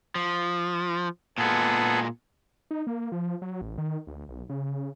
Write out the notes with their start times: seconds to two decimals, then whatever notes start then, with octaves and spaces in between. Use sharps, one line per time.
0.15 F3
1.38 A#2 G#3 B3 G#4 A4
2.71 D#4
2.87 A#3
3.12 F3
3.42 F#3
3.61 A1
3.78 D#3
4.07 D2
4.29 B1
4.49 C#3